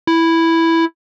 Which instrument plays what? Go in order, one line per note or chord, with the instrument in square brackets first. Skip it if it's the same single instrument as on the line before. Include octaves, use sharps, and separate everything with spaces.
[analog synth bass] E4